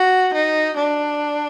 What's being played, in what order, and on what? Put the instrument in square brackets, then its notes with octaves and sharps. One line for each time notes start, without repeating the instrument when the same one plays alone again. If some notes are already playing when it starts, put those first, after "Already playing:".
Already playing: [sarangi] F#4
D#4
D4